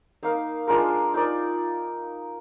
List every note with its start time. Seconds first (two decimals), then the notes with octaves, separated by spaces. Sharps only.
0.23 A#3 D#4 A#4 F5
0.67 G#3 D4 F4 A#4
1.14 D#4 A#4 D5